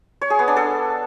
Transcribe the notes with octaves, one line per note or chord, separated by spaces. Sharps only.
C#5
G#4
B3
D4
A4